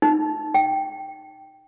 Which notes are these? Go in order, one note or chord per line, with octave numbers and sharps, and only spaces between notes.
D#4
G5